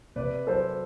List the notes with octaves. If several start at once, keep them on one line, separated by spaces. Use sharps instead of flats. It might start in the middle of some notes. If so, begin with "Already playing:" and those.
C3 B4 D5
F#3 A4 C5